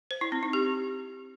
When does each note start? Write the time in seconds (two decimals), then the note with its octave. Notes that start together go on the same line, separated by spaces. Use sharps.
0.11 C5
0.21 E4
0.32 C4
0.43 D#4
0.53 G4